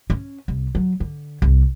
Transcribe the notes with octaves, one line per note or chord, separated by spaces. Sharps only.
C#4
C2
F#3
D3
C2